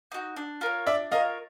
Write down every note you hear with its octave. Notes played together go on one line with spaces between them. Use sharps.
D#4 F#4
D4
F4 A#4 C#5
D4 D5 E5
F4 A#4 C#5 D#5 F5